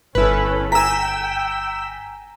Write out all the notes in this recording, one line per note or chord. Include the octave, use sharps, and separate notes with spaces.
G1 C#4 E4 A4 B4
G5 G#5 A#5 E6 B6